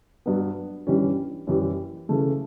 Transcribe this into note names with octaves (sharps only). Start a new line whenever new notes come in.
G2 F#3 B3
G2 E3 G3 C#4
F#2 E3 G3
C#3 E3 A3